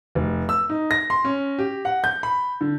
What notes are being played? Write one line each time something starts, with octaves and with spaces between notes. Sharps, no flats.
F1
E6
D#4
A#6
C6
C#4
G4
F#5
G6
B5
D3